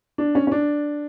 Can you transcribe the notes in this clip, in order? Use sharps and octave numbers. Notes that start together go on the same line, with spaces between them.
D4
C#4
C#4
D4